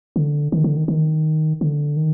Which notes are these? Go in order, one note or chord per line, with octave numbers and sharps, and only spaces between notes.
D3
D#3
D3
D#3
D#3
D3
D#3